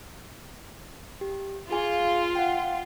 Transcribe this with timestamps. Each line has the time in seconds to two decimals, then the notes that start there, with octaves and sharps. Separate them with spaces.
1.21 G4
1.71 F4 G#4 G#5
2.35 F#5 G5